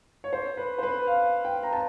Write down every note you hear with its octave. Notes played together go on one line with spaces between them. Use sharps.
C#5
C5
B4
C5
B4
F5
G5
A#5
A5